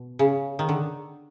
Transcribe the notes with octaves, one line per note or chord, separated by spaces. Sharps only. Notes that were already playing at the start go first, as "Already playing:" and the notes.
Already playing: B2
C#3
D#3
D3